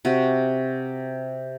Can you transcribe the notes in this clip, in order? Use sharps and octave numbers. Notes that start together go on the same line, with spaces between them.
C3 F#4